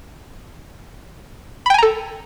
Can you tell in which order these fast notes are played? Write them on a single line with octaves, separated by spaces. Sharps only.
B5 G5 G#5 A#5 A4